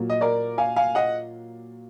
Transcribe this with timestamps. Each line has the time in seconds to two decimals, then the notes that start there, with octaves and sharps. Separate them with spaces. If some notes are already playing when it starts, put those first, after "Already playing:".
Already playing: A#2 F#3
0.10 D#5
0.21 A#4 D5
0.58 F5 G#5
0.76 F5 G#5
0.95 D#5 F#5